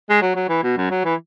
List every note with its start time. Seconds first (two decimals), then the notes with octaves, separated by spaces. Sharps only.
0.10 G#3
0.21 F#3
0.35 F#3
0.49 E3
0.63 B2
0.77 F#2
0.90 F#3
1.05 E3